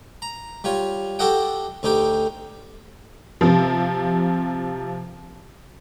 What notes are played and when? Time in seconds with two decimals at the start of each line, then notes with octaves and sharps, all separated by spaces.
0.22 A#5
0.64 G3 F4 C#5
1.19 F#4 G4 A4 D#5 F#5 G5
1.83 D2 D3 D#4 G4 G5
3.41 C3 F3